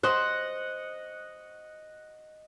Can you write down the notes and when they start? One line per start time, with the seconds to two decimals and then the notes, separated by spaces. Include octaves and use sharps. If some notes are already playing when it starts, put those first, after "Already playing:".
0.03 C5 D#5 F#5